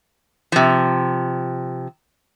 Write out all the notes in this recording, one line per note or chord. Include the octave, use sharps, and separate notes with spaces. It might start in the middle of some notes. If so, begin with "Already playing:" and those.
C3 F3